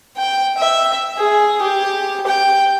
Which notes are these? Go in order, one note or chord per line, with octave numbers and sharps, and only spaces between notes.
G5
E5
G#4
G4
G5